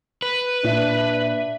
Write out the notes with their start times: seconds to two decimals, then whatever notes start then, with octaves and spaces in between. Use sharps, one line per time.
0.22 B4
0.65 A#2 D4 E5
1.18 E5